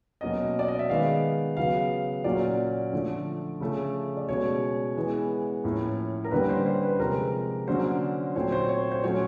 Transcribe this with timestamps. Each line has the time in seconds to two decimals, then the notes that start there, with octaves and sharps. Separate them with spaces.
0.21 B2 F#3 A#3 C#4 D#5
0.59 D5
0.68 D#5
0.79 E5
0.89 D#3 G#3 B3 F5
1.57 C#3 F#3 B3 F5
2.24 A#2 F#3 A#3 C#4 D5
2.93 D3 F3 A3
3.60 C#3 F3 A3 C#4
4.17 D5
4.29 B2 G#3 C#4 C#5
4.96 E3 G#3 B3
5.64 A2 F3 A#3 C#4
6.24 A#4
6.31 D3 G3 A#3 C#4 B4
6.49 C5
6.66 C5
6.83 B4
6.99 C3 F3 G#3 A#4
7.67 D3 F#3 A#3 C#4 C5
8.36 A#2 F#3 A3 C4 C#5
8.52 C5
8.69 C#5
8.91 C5
9.03 A#2 F#3 A3 C#4 C#5